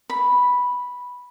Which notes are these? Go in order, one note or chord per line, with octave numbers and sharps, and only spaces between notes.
B5